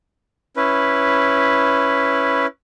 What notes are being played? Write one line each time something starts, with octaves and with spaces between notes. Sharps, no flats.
C#4 E4 B4